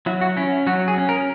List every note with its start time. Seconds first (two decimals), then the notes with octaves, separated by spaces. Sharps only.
0.06 F#3 E4
0.21 F#4
0.37 C#4 E4
0.67 F#3 F#4
0.88 G#4
0.98 C#4
1.09 A#4